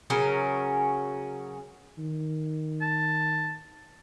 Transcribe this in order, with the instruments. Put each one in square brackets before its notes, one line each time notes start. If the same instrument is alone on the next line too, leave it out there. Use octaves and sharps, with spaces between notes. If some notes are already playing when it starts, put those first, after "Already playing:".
[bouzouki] C#3 F#3 C#4 A#4
[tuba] D#3
[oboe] A5